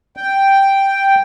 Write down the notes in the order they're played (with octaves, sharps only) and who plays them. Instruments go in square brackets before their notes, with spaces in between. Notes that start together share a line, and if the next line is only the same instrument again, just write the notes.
[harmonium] G5